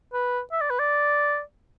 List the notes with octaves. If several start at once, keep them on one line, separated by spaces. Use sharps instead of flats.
B4
E5
D5
B4
D5